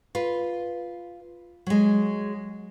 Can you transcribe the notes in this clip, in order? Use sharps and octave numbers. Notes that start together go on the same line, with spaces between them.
F4 B4
F#3 G#3